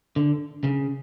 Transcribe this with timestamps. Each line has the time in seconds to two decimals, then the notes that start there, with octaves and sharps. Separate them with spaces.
0.16 D3
0.64 C#3